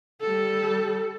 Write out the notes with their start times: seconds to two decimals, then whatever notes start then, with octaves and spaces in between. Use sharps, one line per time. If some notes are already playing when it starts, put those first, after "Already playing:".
0.21 G3 A4